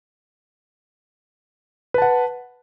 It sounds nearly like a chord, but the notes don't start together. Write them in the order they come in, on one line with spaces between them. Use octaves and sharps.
B4 A5 F#5